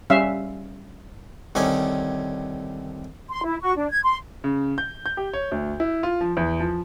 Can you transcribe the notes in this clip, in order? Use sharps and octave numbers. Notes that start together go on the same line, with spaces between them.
G3 C#4 E5 F5
C2 D3 D#3 C#4 G#5
C6
E4
F#4 C#6
D4
G#6
C6
C#3
G6
G6
G4
C#5
D2
E4
F4
F3
E2
F3